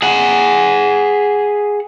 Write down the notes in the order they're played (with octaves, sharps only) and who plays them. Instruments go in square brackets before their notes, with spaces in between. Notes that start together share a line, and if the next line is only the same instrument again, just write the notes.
[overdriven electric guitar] G#4 F#5